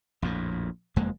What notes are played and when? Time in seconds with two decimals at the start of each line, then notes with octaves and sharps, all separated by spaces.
0.22 A#1 F2 A2
0.96 F#1 F2 G#3 A#3